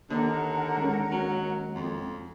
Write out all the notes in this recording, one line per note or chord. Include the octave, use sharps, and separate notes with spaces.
D#2 D3 A#4 F#5 A#5
G#3 C#4
F#3
F2